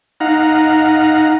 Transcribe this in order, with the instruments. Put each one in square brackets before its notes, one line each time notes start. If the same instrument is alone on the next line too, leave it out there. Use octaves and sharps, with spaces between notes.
[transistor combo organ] D#4 F5 F#5 A#5